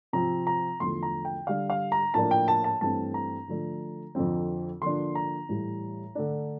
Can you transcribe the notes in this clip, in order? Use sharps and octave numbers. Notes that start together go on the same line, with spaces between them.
C3 F3 C4 A#5
A#5
E2 D3 F3 A3 C6
A#5
G5
D3 G3 D4 F5
F5
A#5
A2 F3 A#3 D4 A5
G5
A5
A5
G2 E3 A3 C4 A5
A#5
D3 F3 A3 D4
F2 D3 F3 C4
D3 F3 A#3 D4 C6
A#5
A2 E3 G3
D3 A3 D4